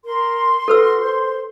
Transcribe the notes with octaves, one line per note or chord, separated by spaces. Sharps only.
A#4 C6
F#4 A4 B4 E6
C5